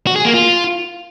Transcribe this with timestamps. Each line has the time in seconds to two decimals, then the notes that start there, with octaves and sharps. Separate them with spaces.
0.07 F#4
0.16 G#4
0.25 A#3
0.34 F4